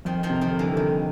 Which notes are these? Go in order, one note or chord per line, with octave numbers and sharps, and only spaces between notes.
F2 D#3 F3
D#3 F3
C3
D#3 F3
G1
D3 E3
G1 D#3